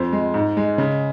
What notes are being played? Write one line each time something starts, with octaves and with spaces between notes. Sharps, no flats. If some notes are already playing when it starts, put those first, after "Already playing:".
Already playing: F2 C5
G#3
G#2
G#3
C#3